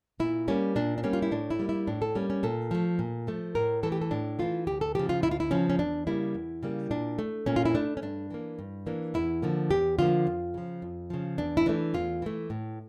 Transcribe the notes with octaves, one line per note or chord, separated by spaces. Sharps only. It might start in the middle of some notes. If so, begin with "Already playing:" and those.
A#2 E4
G3 A#3 C#4
A#2 D4
D4
G3 A#3 C#4
F4
E4
A2 D4
E4
G3 A#3
E4
A2 D4
A4
G3 A#3 C#4
C#4
A#2 A4
F3 A3
A#2
F3 A3
A2 A#4
E3 A3 A4
G4
A4
A2 D4
E3 A3 F4
D2 G4
A4
C#3 F3 G4
F4
D2 E4
F4
E4
C#3 F3 C#4
C#4
E2 D4
C#3 G3 A#3 E4
E2
C#3 G3 A#3
A#2 D4
A3
A#2 C#4
F4
E4
A3 D4
C#4
G2 D4
E3 A#3
G2
E3 A#3 D4
E2 E4
D3 F3 A#3
E2 G4
D3 F3 A#3 F4
F2
C#3 F3
F2
C#3 F3
E2 D4
E4
E3 A3 D4
E2 F4
E3 A3
A2